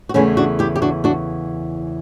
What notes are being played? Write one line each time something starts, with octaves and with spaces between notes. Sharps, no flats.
F#4
E2 C#3 E3 A3 C#4 E4
D4 F#4
E4 G4
G4
D4 F#4
D4 F#4